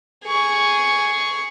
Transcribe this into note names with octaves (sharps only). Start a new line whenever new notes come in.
G#4 C#6